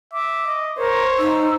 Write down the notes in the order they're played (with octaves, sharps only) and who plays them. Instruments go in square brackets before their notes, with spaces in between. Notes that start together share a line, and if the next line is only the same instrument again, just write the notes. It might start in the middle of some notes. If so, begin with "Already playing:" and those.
[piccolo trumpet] E5 [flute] D6
[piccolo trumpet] D#5
[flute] A#4 [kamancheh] C5 [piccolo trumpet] C#5
[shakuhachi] D#4 [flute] E6